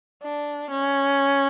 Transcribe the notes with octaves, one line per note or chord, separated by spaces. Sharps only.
D4
C#4